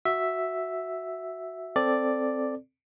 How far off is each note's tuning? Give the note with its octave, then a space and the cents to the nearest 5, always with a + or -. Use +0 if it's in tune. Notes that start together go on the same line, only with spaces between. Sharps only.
F#4 +0 E5 +0
C4 +0 A4 +0 D5 +0